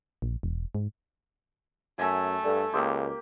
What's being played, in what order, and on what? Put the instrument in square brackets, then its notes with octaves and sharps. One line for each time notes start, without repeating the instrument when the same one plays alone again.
[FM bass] A#1
E1
G#2
[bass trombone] F#2 [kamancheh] A3 [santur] G#5
[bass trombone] G2 [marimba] A4 D5
[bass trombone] C#2 [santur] A#3 G4 [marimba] C6 D#6 E6